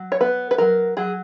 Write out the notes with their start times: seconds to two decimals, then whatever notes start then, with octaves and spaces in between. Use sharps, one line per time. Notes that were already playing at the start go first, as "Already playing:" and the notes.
Already playing: F#3
0.12 C#5
0.21 B3 B4
0.51 B4
0.58 F#3 A#4
0.97 F#3 G#4